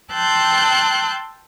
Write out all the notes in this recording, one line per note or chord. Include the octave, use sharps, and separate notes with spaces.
G5 A5 C6 E6 F#6 G6